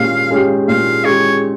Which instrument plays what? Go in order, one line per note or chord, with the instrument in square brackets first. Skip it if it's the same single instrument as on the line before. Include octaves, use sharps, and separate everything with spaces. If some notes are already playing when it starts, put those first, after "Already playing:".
Already playing: [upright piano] A#2 G#3 C#4 G4 [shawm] F5
[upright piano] G#3 C#4 G4
[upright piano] A#2 [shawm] F5
[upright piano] G#3 C#4 G4 [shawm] C#5